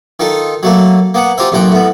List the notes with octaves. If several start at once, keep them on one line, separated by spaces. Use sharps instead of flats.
D#3 D#4 F4 A4
F#3 A3 A#3
A#3 B3 F#5
F4 G4 A#4 C5 E5
A1 F#2 A#2 F#5 G5
A2 B3